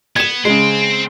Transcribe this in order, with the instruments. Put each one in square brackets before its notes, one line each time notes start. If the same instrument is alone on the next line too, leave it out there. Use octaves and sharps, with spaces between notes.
[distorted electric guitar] B3 [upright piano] G#6 E7
[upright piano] C#3 G#3 [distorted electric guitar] C4